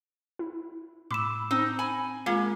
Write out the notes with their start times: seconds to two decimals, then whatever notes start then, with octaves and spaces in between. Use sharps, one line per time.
0.39 E4
1.11 A2 B5 D6 E6 E7
1.51 C4 D#4 E6
1.79 G#5 B5
2.26 G#3 A#3 F4 G#4